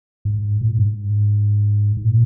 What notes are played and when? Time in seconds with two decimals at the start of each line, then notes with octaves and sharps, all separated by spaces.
0.25 G#2
0.61 A#2
0.69 G#2
0.77 G2
0.85 G#2
1.97 G#2
2.05 A#2